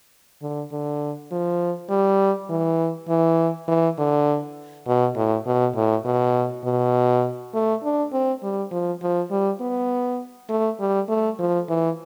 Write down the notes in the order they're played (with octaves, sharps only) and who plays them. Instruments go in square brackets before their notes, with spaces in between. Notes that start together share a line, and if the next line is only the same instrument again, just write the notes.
[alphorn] D3
D3
F3
G3
E3
E3
E3
D3
B2
A2
B2
A2
B2
B2
A3
D4
C4
G3
F3
F3
G3
B3
A3
G3
A3
F3
E3